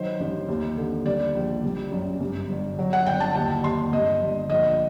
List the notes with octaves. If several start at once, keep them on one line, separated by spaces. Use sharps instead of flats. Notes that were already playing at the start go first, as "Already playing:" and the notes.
Already playing: D#3 F#3 C5
A1
D#2
D3
G3 D5
A#1
G3
F#2
G2
G1
F#3
F#5
G1 G5
A5
D#2 A5
D#2 C6
G2 D#5
G1
A#1 D#5